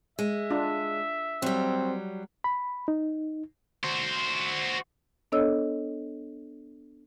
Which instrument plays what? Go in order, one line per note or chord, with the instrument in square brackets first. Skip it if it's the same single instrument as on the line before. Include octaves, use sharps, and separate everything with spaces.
[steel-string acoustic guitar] G#3 [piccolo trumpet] E5
[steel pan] D4 F4
[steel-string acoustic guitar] F#3 G3 [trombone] C4
[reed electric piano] B5
D#4
[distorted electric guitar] F#4 C5
[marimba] B3 D4 A4 C#5 D#5 E6